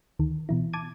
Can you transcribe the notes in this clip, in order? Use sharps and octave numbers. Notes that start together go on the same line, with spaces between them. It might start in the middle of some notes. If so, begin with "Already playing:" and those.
D2 D#3
B2 E3 E4
A5 D6 G#6 D#7